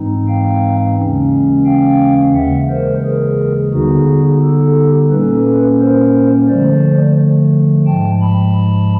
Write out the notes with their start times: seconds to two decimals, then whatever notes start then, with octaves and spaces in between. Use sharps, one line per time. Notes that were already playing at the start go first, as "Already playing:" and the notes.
Already playing: G#2 E3 G#3 C4 D#4
0.28 F5 G5
0.96 D#2 C#3 E3 G#3 C#4
1.66 F5 G5
2.34 D#2 C#3 E3 G#3 E5 F#5
2.69 A#4 C5
3.03 G#4 A#4
3.73 D3 G3 B3 D#4 F#4 G#4
4.42 G4 A4
5.11 A#2 G3 A#3 C#4 A4 B4
5.80 A#4 C5
6.49 D3 F3 A3 C5 D5
7.87 G#2 F3 G#3 G5 A5
8.21 A5 B5